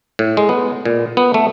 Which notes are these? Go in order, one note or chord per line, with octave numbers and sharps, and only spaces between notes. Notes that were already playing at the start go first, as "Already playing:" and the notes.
A2
G#3
B3
A#2
B3
A3